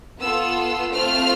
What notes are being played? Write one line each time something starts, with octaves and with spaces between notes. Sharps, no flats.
B3 F4 A4 E6
A3 C4 F4 F6